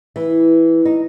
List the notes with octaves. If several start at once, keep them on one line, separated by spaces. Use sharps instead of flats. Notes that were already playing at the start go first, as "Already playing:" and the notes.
E3
D#4